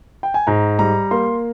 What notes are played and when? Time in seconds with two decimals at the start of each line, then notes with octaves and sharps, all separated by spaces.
0.23 G5
0.34 G#5
0.47 G#2 A#5
0.79 G3 A#5
1.11 A#3 C6